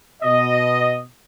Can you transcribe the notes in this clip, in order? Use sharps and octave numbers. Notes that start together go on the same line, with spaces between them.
B2 D#5